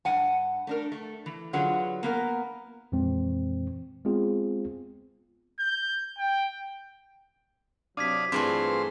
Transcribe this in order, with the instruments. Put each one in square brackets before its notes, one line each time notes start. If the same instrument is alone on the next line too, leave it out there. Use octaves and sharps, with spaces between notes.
[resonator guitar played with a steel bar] G2 F#5 G#5
A3 D4 A#4
A3
E3
D3 F#3 F4 G#4 B4 F#5
A#3 B3 A#4
[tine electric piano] F2 A#2 E3 G#3 C4
G#3 B3 C4 F4 G#4
[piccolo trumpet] G6
G5
[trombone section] C3 F#3 [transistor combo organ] D4 F5 D#6 [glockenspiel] D6 G#6 B6
[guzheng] G2 E3 A3 [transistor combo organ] C4 F4 C6 [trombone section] G#4